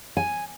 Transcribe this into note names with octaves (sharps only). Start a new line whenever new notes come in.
G#5